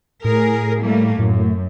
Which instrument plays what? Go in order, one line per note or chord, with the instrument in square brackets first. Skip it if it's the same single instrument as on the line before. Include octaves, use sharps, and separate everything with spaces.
[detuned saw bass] A2 [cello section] G#4 A#4
[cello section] G3 A3 A#3
[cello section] F#2 [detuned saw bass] A2